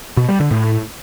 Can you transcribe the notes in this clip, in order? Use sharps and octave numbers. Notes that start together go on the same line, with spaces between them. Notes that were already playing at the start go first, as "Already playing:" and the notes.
B2
G3
D3
A2